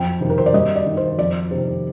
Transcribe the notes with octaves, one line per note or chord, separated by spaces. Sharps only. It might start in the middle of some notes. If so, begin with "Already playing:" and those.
Already playing: F2 G5
C3 D#3
A#4
C5
D5
G2 D#5
D5
D#3
C5
F2 D5
C3 D#3